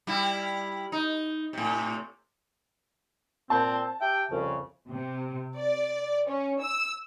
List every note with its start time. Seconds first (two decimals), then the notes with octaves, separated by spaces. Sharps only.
0.07 G3 E4
0.92 D#4
1.53 A2 C3
3.50 A#2 C4 A5
4.01 G4 E5 G5
4.31 C2 F2 C#3
4.89 C3
5.57 D5
6.29 C#4
6.63 E6